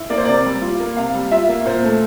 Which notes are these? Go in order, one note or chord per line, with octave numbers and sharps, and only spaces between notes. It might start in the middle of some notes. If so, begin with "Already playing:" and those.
Already playing: E4
A#3 D5
C5
C3 D5
G3
F4
A#3
C3 F5
G3
F4 E5
A#3
A#2 C5
A3